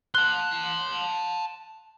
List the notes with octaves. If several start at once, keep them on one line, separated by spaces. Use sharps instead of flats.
A5 C6 F#6 G7